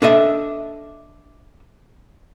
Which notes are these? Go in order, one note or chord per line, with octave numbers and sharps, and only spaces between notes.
D4 A4 D#5 E5